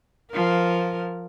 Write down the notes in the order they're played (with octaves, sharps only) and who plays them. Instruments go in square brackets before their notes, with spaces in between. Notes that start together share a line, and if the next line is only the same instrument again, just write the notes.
[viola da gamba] F3 A#4